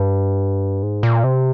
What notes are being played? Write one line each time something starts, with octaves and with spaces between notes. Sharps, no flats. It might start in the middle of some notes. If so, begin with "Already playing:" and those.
Already playing: G2
G#2
A#2
C3